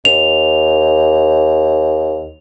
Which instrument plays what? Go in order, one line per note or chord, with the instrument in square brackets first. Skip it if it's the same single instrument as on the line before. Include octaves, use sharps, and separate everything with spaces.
[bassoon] D#2 [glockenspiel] F7